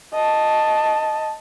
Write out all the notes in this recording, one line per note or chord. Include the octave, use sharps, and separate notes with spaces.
D#5 A5